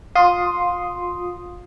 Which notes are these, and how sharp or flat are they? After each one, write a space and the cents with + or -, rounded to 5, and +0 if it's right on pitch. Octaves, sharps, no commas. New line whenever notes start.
F4 +25 C6 +0 D#6 +0